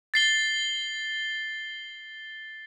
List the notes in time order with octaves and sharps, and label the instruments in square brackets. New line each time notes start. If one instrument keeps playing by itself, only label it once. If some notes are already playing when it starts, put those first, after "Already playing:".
[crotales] A6 C7 G7